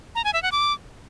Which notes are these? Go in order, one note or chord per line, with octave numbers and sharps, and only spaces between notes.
A#5
G#5
E5
F#5
D6